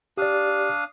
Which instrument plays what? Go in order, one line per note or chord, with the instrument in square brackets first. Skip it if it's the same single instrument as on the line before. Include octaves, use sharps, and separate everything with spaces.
[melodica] D4 F5 D#6 [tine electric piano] G4 D5